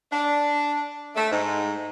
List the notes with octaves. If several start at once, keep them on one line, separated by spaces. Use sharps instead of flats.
D4
A3
G#2